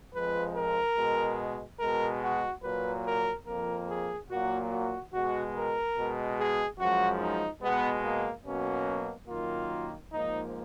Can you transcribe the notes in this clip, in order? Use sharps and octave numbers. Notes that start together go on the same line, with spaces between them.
F2 F3 G#3 B4
A#4
B2 G#3
B2 G#3 A#4
F#4
A#2 F#3 A#3 B4
A#4
F2 F3 A#3 A#4
G#4
A#2 F#3 A#3 F#4
F#4
B2 G#3 F#4
A#4
B2 G#3
G#4
F#2 F3 G#3 F#4
D#4
B2 G#3 B3
A#3
B2 F#3 A#3 C#4
F#2 D#3 A#3 F4
G#2 F3 A#3 D#4